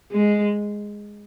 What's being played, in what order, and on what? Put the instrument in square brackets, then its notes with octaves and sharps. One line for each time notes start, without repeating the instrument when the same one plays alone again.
[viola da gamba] G#3